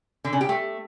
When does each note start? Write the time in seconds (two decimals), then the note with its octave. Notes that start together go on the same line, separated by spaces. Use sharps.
0.25 D3
0.33 C#3
0.41 G4
0.49 A3